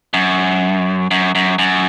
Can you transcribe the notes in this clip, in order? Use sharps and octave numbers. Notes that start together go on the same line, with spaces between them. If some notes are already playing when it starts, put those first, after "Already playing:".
F#2
F#2
F#2
F#2